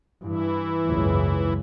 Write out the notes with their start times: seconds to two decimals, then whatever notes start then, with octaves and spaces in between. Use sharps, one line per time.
0.23 G2 E3 E4
0.87 F#1 C#2 G#2